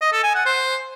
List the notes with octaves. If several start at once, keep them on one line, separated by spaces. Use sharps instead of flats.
D#5
A4
G#5
F#5
C5